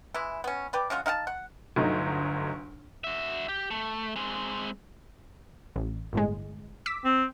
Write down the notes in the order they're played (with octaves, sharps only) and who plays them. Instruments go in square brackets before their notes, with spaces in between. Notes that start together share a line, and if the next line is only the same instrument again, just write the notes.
[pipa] E3 G#3 E4
B3 C#4
G4 B4 D5
G#3 C#4 F4 F#4
D#4 F5 F#5 A5
F#5
[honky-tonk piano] G1 D2 F#3 A3 D#4
[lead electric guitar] F#4 E5
G4
A3
G#3 C4
[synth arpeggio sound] A1
G1 A2 G#3
D6 E6 B6
[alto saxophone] C4